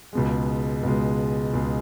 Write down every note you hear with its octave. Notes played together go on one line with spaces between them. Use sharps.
C#2 B2 G#3
C#2 B2 G#3
C#2 B2 G#3